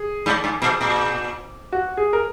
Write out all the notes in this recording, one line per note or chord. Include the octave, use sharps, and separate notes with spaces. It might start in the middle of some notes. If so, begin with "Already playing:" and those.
Already playing: G#4
G#2
G#2
A#2
A#2
F#4
G#4
A#4